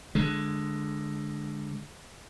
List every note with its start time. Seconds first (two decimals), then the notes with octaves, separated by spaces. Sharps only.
0.15 D3 G#3